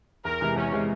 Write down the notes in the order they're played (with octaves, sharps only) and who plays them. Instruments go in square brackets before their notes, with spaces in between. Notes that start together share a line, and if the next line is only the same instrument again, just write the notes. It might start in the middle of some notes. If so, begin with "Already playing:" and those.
[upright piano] E2 [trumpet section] A#4
[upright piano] C3 E3 G#3 E4
[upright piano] E2 [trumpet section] C#4
[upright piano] C3 E3 G#3 E4